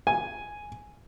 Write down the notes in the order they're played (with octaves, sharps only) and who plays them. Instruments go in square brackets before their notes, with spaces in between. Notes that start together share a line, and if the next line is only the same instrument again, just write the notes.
[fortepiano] G#5